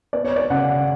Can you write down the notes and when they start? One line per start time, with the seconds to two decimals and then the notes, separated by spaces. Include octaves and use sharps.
0.13 B3 D5
0.25 C#5
0.36 D5
0.50 C#3 F#5